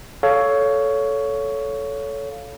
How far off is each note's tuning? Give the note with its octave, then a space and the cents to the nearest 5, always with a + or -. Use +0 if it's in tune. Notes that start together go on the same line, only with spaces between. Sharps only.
A4 -10 C#5 +15 F5 +0